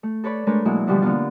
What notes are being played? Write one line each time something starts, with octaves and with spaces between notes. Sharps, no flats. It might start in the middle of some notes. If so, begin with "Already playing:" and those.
A3
A4 B4 C#5 D5 B5
G#3 A3 D4 A#4 B4 C#5
B2 F#3 G#3 A#3 E4
B2 D3 E3 F3 G3 G4
D3 A#3 B3 F4